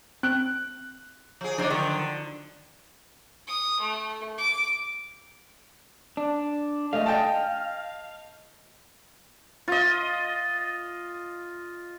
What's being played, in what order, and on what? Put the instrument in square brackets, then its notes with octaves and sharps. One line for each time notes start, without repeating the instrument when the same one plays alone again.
[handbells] C4 D7 [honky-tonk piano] F#6
[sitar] F3 G#4
[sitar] F3 G#3 D#4 [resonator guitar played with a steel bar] D4 C5 D5
[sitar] D3 [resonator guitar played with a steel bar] D#3 F3 F#3
[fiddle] D#6
A3
D6
[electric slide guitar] D4
[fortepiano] A3 D#5 [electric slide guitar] F5
[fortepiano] D#5 G5 A5
[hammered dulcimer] F4 D#5